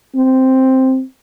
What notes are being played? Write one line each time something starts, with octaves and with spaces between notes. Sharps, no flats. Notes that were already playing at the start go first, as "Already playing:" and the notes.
C4